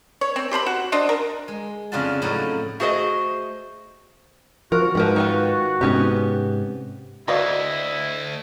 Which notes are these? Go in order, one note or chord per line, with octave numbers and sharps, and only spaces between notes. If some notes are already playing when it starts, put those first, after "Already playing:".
C#5
C4
G4 C5 A#5 B5
F#4
D4 C5 D#5
A#4
G#3
F2 C#3 D4 F4 F#5 A5
A2 F3 F#3 D#4
A3 F#4 G#4 C5 D#5
F3 F#4 A#4
G#2 F3 A#4 B4
D#3 F4 B4
G#2 C3 B3 C#4 G4
D2 E4 F#4 D5 D#5 F5